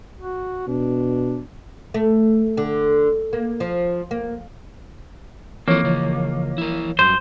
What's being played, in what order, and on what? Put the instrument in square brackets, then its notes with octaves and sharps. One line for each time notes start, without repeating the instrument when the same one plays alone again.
[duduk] F#4
[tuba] B2 [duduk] D4
[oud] A3
D3
A#3
F3
A#3
[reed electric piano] E3 F3 C#5 [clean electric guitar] A#3 [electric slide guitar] C4 A4
[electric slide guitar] C#3 F4
E4 A#4
[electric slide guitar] G2 F#3 [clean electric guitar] C5